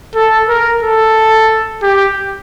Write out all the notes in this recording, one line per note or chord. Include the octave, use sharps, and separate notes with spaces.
A4
A#4
A4
G4